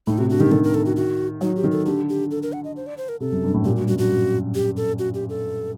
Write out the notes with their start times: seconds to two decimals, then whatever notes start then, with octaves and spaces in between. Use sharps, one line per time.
0.07 A2 D#4
0.18 C3 F#4
0.30 D3 F#4
0.40 D#3 G4
0.51 D#3 A4
0.64 A#4
0.74 A4
0.86 F#4
0.96 F#4
1.41 F#3 D#4
1.56 G4
1.64 D#3
1.72 A4
1.86 D3 G4
2.09 G4
2.31 A4
2.43 A#4
2.53 F#5
2.64 D#5
2.76 C5
2.87 D5
2.97 C5
3.09 A#4
3.20 C3 A4
3.32 F#2
3.43 G2
3.54 A2
3.65 A#2 G4
3.76 G2 F#4
3.88 F#2 F#4
3.98 G2 F#4
4.10 F#2
4.55 G4
4.77 A4
4.99 F#4
5.14 G4
5.30 A4